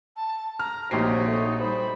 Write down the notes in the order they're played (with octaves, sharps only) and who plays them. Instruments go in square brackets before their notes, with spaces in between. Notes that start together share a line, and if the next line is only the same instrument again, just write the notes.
[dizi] A5
[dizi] A#5 [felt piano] F6
[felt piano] A#1 G4 C7 [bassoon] C3 [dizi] D#4 [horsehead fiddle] F#4 C#5
[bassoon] A3
[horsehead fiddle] G3 B5 [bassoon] C5